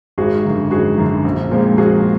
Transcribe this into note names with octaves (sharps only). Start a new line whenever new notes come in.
G#1 F#4 G#4
F#2 D3
G#1 F#4 G#4
F#2 D3
A#1
A#2 F3 G#3 C4
A#1 F#4 G#4